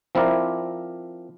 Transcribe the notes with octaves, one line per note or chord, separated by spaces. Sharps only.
F3 C4 E4 A#4 D5